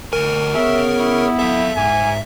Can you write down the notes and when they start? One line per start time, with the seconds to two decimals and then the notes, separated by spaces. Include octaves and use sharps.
0.13 D2 A#4 G#5
0.55 B3 G#4 C#5 E5
0.99 E4
1.39 A4 E5 F5
1.77 G#2 G#5